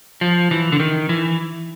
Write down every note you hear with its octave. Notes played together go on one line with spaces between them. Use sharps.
F3
E3
D3
D#3
E3